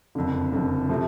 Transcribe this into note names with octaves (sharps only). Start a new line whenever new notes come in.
F#1 F2 D3
F#1 F2 D3
C3 F3 A3